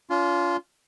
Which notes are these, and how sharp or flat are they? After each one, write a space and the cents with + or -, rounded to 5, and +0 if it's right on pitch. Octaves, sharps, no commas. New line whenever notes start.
C#4 +45 F4 -10